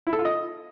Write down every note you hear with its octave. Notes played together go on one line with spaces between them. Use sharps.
E4
A4
F4
D#5